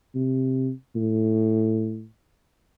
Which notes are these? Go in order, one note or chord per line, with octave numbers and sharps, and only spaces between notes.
C3
A2